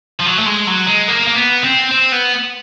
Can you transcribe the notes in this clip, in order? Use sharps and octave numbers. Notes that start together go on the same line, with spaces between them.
F3
F#3
A3
G#3
F#3
G#3
A#3
A#3
B3
C4
C4
B3